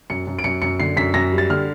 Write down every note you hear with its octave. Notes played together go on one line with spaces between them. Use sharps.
F#2 C#7
F#2
D7
F#2 C#7
F#2 C#7
D3 C7
F#2 B6
F#2 A#6
G3
A6
D3 F6